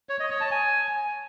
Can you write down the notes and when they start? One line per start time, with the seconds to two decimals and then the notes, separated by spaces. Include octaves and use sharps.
0.09 C#5
0.20 D#5
0.30 C#5
0.41 A5
0.51 G#5